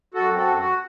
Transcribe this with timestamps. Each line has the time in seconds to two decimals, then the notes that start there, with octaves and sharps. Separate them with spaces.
0.14 F#2 F#4 A4
0.31 C4
0.37 F#4 A4
0.48 F#2
0.59 F#4